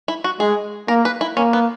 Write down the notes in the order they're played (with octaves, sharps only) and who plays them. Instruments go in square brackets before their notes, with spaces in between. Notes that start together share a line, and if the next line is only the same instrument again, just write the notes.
[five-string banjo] E4
F#4
[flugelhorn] G#3 [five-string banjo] G#4
[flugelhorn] A#3 [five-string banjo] A#4
[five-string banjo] B4
E4
[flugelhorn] A#3 [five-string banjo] C#4
[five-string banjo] B3